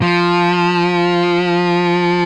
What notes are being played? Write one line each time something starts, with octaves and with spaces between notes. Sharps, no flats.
F3